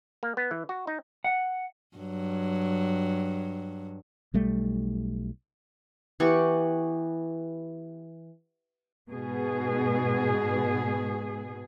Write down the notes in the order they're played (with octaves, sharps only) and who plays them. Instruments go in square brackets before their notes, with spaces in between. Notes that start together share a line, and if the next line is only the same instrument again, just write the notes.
[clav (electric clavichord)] A#3
B3
E3
F#4
D#4
[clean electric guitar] F#5
[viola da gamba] G2 F#3
[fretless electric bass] B1 G3 A3
[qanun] E3 B3 G4 C#6
[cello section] G#2 B2 G#4